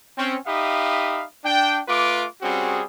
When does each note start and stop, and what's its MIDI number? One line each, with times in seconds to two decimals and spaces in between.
0.17 0.36 60
0.17 0.36 61
0.46 1.24 63
0.46 1.24 67
0.46 1.24 76
0.46 1.24 77
0.46 1.24 83
0.46 1.24 87
1.44 1.80 62
1.44 1.80 79
1.88 2.26 57
1.88 2.26 65
1.88 2.26 71
1.88 2.26 86
2.42 2.82 55
2.42 2.82 60
2.42 2.82 61
2.42 2.82 66
2.42 2.82 68